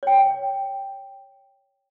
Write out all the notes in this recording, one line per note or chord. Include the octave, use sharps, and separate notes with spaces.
C#5 G5